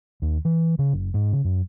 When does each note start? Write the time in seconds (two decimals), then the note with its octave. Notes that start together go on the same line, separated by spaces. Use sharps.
0.22 D#2
0.45 E3
0.79 C#3
0.93 F#1
1.14 G#2
1.33 C#3
1.44 F#2